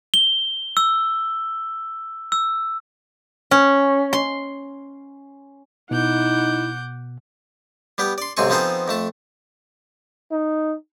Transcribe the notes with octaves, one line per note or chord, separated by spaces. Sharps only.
G7
E6
E6
C#4
C6
B2 D#4 E4 F#5 D6 G6
G3 B3 G4
D5 C6
B1 G#2 C3 C4 G#5 C#6
F3 B3 C4 D#4 G#4 A4
F2 A3 A5
D#4